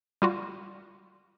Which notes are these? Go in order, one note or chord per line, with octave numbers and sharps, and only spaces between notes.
G3 F4 F#4